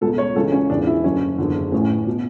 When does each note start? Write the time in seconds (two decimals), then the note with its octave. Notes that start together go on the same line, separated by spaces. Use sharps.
0.01 C#2 B2 A4
0.18 C#5
0.36 C#2 C#3 E3 A4
0.52 C#4
0.70 E1 E2 C#3 E3 D4
0.87 E4
1.04 F#1 F#2 D3 C#4
1.38 F#1 E2 D3
1.72 A1 A2 E3 C#4
2.07 B2